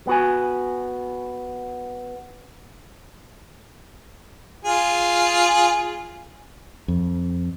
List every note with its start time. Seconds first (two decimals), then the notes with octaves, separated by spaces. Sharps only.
0.07 B3 F#4 G#5
4.65 F4 G#4
6.88 F2